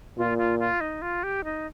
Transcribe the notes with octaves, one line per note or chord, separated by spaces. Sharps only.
A#2 F4
F4
F4
D#4
F4
G4
D#4